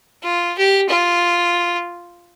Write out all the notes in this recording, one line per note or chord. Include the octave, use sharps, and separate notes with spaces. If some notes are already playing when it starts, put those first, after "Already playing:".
F4
G4
F4